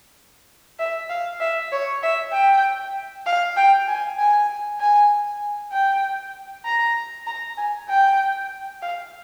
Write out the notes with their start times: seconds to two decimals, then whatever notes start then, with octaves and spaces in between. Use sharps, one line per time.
0.79 E5
1.10 F5
1.40 E5
1.72 C#5
2.03 E5
2.33 G5
3.26 F5
3.57 G5
3.87 G#5
4.19 G#5
4.80 G#5
5.72 G5
6.65 A#5
7.27 A#5
7.57 G#5
7.88 G5
8.82 F5